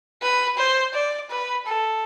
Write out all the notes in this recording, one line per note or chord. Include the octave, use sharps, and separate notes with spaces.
B4
C5
D5
B4
A4